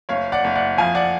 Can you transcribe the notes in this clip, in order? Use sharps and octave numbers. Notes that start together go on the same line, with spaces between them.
F#1 C#5 F5
D5 F#5
F#1
D5 F#5
F2 F5 G#5
D5 F#5